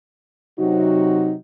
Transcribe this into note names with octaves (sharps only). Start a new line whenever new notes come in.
C3 F#3 D#4 F#4